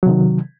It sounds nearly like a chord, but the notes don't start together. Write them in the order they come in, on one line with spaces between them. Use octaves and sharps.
F#3 C3 D#3